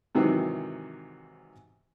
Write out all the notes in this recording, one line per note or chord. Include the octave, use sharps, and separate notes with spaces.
G#2 C3 D#3 E3 F#3